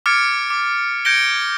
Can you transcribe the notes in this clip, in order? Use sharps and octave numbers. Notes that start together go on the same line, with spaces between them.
D6 F6 G#6 A6 C#7 D7
D6
G6 G#6 A#6 C#7 D7 G7